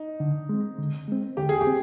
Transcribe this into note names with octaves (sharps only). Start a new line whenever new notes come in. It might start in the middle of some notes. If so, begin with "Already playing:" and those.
Already playing: D#4
D3
G#3 C4
D3
G#3 C4
D3 G4
G#4
G4
C4